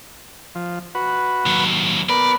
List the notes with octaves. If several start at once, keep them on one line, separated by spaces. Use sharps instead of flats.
F3
F#4 B4
D#2 F#3
B3 A#4 B4 D5